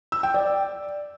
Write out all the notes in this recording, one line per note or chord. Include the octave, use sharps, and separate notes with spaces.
E6
G5
D5